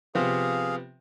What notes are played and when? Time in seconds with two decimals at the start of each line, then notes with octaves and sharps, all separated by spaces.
0.15 C3 F3 B3 G#4 F5